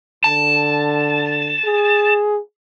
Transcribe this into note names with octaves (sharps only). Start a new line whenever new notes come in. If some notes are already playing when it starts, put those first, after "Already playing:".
D3 A5
G#4